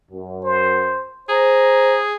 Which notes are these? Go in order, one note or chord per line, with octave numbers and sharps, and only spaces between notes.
F#2
C5
G#4 C5 A#5